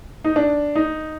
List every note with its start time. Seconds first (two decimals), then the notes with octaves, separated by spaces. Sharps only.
0.24 D#4
0.36 D4
0.75 D#4